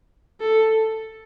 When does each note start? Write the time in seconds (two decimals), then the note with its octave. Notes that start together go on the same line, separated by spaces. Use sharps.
0.41 A4